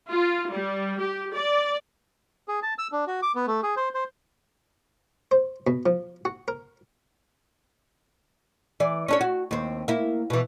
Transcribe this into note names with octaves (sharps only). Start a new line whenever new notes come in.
F4
G3
G4
D5
G#4
A5
E6
D4
F#4
D6
B3
A3
G#4
C5
C5
C5
B2
F3
F#4
A#4
E3 D5
C#4 D4 C#5
F#4
D#2 C4
A#3 E4
B2 E3